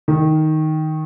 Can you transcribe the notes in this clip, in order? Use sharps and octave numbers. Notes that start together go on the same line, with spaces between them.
D#3